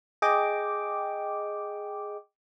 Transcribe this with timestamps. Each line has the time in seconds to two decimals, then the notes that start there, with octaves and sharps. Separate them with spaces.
0.22 G#4 D#5 G5 D6